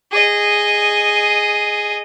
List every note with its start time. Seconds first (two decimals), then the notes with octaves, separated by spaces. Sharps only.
0.12 G#4 D#5